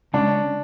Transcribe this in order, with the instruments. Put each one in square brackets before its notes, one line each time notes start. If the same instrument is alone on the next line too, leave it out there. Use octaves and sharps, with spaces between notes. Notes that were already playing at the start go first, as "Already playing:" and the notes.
[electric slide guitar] C#3 G#3 C#4 [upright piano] D4